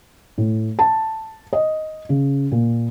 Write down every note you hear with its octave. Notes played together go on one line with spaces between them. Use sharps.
A2
A5
D#5
C#3
A#2